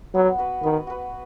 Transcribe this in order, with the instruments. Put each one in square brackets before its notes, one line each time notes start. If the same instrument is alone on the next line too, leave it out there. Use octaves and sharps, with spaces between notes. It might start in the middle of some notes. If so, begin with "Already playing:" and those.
[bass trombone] F#3 [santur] B3
[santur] F#4 B4
[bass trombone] D#3 [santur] B3
[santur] F#4 B4